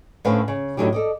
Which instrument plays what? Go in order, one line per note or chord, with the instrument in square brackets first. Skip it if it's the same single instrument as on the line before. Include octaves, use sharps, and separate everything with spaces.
[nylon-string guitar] A2 D3 C4 C#4 B4 F5
C#3
A2 D3 F#3 D#4 G4
A4 D5 D#5